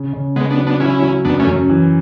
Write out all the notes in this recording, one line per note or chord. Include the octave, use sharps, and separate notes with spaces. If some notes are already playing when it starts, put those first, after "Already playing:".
Already playing: C#3
C#3
C#3 G#3 B3
B3 D4
F#3
B3 D4
F#3 C#4 E4
F#3
F#2 B3 D4
A3 C#4
F#2
E3